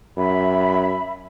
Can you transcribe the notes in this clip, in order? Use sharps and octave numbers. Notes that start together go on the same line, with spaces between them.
F#2 E5 B5